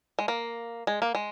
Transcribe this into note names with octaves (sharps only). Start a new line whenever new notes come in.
G#3
A#3
G#3
A#3
G#3